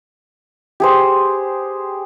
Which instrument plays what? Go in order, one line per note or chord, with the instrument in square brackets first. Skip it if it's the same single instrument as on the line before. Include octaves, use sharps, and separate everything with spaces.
[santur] G4 G#4 C5